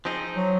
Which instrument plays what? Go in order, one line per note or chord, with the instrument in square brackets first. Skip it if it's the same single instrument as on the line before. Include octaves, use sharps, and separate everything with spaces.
[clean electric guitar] F3 C4 D#4 G#4
[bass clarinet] F#3